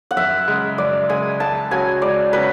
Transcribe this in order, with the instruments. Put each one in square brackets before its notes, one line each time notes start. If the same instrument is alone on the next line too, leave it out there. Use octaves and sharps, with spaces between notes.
[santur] F#5
[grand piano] F#2 [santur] E5
[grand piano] C#3 G#3
[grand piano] F#2 [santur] D5
[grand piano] C#3 G#3 [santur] G#5
[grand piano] C#2 [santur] A5
[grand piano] C#3 F#3 C#4 F#4 [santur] G#5
[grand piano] C#2 [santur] D5
[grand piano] C#3 F#3 C#4 F#4 [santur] B4